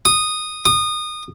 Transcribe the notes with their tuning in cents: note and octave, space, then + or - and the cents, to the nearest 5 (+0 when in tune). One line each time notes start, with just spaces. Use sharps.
D#6 -10
D#6 -25